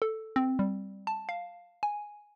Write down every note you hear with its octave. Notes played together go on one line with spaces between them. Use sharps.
A4
C4
G3
A5
F5
G#5